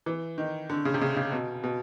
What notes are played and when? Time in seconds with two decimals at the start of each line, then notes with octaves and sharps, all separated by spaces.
0.06 E3
0.38 D#3
0.70 D3
0.85 C#3
0.94 C3
1.01 C#3
1.16 C#3
1.32 B2
1.64 B2